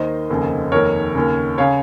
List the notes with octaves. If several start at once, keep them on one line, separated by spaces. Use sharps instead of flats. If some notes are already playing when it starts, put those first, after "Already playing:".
Already playing: D#2 D#3 C5 D#5
F1 D#2 C#3
F1 D#2 D#3 A#4 C#5
D#2 C#3
C#3 C#5 F5